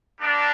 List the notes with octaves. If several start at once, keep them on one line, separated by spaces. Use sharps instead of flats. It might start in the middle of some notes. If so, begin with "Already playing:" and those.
G3 A#3 D4